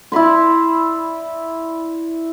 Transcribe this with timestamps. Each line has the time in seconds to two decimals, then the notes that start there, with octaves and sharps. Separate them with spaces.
0.12 E4 D5 B5 C6